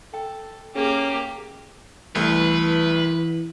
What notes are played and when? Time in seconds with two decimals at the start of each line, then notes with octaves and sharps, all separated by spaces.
0.14 A4 G5
0.75 A#3 C#4 G4 G#4
2.15 C2 E3 A3 B4